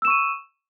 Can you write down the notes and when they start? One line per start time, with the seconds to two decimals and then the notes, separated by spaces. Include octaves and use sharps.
0.02 E6
0.05 E7
0.07 C#6
0.10 D#7